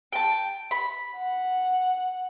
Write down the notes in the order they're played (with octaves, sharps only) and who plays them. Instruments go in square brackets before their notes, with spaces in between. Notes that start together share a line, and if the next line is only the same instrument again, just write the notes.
[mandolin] G5 A5
B5
[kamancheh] F#5